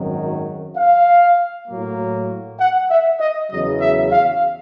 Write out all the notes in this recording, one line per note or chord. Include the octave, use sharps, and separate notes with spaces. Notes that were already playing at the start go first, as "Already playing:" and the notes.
Already playing: G#1 F#2 D#3 F#3
F5
A2 F#3 A#3
F#5
E5
D#5
E2 C#3 F#3 D#5
E5
F5